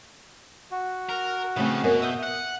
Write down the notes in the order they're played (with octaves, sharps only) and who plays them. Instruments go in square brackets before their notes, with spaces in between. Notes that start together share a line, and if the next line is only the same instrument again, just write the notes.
[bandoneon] F#4
[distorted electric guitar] A#4
[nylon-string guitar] C#3 A3 C4 [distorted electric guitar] E3 F3
[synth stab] F#2 F#3 A#3 [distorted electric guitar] B2 [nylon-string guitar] G#5
[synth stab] E5 D#6 G6
[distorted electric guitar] F#5